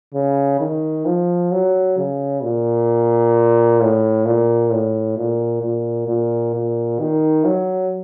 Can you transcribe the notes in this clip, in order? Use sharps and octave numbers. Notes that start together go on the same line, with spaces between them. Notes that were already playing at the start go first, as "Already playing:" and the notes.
C#3
D#3
F3
F#3
C#3
A#2
A2
A#2
A2
A#2
A#2
A#2
A#2
D#3
F#3